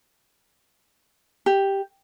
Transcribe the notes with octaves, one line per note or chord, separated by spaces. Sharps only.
G4